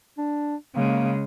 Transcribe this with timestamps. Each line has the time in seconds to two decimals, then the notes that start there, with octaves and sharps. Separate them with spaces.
0.18 D4
0.76 C#3 G#3 A#3